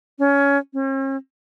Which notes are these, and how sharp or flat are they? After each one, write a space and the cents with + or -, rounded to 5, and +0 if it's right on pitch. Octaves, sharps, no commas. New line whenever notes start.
C#4 +20
C#4 -45